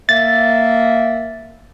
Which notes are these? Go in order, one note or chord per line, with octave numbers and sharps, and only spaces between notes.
A#3 E5 A6